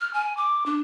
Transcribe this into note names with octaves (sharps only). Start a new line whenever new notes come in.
F6
G#5
D6
D4